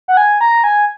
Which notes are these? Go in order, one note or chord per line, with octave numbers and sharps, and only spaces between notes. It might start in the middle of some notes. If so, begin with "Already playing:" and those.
F#5
G#5
A#5
G#5